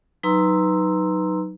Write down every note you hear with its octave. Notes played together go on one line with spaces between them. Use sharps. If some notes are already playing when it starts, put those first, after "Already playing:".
F#3 D#4 B4 A#5 C6 E6